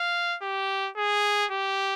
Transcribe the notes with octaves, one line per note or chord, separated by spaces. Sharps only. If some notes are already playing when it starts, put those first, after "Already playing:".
Already playing: F5
G4
G#4
G4